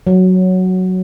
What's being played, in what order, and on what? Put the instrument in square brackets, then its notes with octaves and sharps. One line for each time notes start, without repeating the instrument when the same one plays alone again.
[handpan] F#3